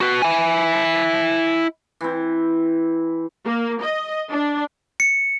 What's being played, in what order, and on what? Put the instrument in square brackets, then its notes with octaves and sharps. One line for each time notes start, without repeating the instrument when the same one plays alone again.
[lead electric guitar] F#4 B4
E4 G#5
[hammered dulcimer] E3 C4
[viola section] A#3
D#5
D4
[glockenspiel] C#7